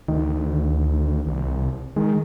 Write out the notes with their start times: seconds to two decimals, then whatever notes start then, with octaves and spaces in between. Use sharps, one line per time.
0.08 D2 D#3
1.26 C2
1.96 D#3 G#3